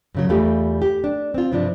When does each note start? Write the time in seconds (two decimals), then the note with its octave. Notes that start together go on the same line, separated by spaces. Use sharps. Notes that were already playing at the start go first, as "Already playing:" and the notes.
0.14 F#2 C#3 F#3
0.29 E2 G3 A3 F4 G4
0.82 G4
1.04 D4
1.34 C4 F4
1.52 G2 C3 F3 D4